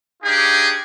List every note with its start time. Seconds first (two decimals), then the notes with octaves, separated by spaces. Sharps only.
0.23 D4 D#4 F4 G4 G#4